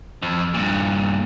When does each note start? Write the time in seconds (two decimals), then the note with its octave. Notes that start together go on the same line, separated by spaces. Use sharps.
0.22 F2
0.54 G2 A#2